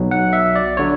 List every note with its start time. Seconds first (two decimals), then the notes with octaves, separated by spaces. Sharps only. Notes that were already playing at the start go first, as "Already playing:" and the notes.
Already playing: B1 B2 F#3
0.11 F#5
0.33 E5
0.55 D5
0.77 D3 F#3 C#5